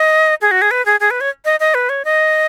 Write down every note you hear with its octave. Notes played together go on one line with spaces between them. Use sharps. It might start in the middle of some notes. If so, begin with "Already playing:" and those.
Already playing: D#5
G#4
F#4
G#4
B4
G#4
G#4
B4
C#5
D#5
D#5
B4
C#5
D#5